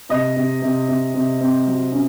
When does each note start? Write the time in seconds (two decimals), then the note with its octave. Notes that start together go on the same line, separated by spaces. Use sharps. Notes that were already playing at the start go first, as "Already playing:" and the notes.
0.09 C3 D#5
0.36 C3
0.62 C3
0.88 C3
1.14 C3
1.41 C4
1.66 F#3
1.92 C#4